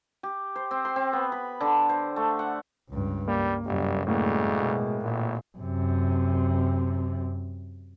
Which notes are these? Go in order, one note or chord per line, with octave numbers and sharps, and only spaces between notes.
G4
C5
C4
C6
C4
B3
B5
D3
C5
A3
F#5
C#2 G2
G3 A#3
G1 F#2 C3 G3
D2 A2 G#3 A#3
B2
G#1 A#2
F#2 C3